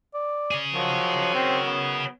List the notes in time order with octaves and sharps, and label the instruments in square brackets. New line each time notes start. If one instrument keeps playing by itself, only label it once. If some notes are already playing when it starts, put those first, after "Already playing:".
[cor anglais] D5
[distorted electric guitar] G#4 C#5
[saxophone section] D#3 F#3 [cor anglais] F3
[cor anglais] C4
B3